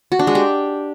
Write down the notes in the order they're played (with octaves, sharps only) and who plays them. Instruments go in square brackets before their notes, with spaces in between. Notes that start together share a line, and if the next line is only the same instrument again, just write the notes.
[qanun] F#4
D4
G#3
G4